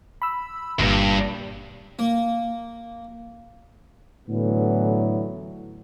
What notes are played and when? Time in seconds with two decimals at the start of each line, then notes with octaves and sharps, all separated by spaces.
0.22 B5 E6
0.79 G1 D2 G2 A#2 A#6
1.99 A#3
4.28 A2 D3 E3 F#3 B3